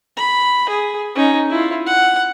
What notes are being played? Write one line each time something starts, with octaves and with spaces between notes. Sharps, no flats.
B5
G#4
C#4 D#4
E4 F4
F#5